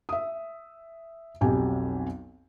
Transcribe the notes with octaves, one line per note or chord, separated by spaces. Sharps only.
E5 D#6
B1 F2 F#3 G4 G#5